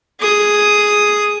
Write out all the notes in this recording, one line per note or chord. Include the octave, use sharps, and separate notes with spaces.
G#4 D#6